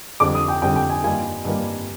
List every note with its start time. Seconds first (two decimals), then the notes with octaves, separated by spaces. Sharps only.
0.20 F2 D3 G3 C4 D6
0.35 D#6
0.48 G5
0.62 F2 D3 G3 C4 G5
0.76 G5
0.90 G#5
1.04 G2 D#3 G3 A#3 F4 G#5
1.45 G2 D#3 G3 A#3 F4